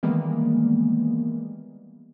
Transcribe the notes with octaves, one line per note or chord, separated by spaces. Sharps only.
D#3 E3 G3 G#3 A#3 B3